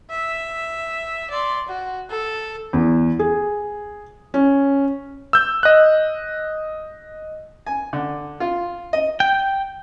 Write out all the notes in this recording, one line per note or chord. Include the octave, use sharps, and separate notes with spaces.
E5
D5 C6
F#4
A4
E2
G#4
C#4
E6 G6
D#5 F#6
G#5
D3
F4
D#5
G5